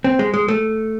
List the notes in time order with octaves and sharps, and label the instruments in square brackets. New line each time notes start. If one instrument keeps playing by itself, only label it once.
[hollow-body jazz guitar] C4
G#3
G#3
A3